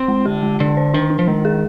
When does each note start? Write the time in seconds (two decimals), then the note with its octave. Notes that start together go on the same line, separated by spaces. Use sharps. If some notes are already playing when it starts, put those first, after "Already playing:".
Already playing: C4
0.08 G#3
0.25 D3 G4
0.43 G#3
0.60 D3 D4
0.77 C5
0.94 D#3 D4
1.10 D4
1.19 F3
1.28 D#3 G#3
1.45 G#4